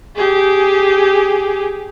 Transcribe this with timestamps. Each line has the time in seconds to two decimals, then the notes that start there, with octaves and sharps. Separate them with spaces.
0.16 G4 G#4